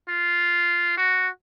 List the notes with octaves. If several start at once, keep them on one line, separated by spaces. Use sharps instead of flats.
F4
F#4